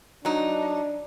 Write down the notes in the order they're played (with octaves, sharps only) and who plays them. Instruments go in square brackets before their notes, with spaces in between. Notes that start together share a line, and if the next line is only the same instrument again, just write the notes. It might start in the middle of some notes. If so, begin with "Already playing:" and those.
[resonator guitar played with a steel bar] F#3 D#4 [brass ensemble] D4